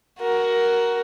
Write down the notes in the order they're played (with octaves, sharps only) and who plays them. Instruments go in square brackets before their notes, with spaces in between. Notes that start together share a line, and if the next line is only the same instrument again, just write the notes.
[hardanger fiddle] F#4 A#4